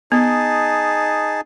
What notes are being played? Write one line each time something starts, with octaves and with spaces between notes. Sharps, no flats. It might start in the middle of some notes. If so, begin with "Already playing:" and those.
B3 D#4 G#4 A5